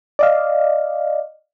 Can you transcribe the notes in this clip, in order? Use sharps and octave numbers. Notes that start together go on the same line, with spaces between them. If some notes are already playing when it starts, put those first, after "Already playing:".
D5 D#5 F5